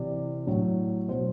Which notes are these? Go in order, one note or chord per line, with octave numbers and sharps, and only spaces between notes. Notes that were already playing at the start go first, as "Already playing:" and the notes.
Already playing: C3 E3 D5
A2 F#3
B2 F#3 C5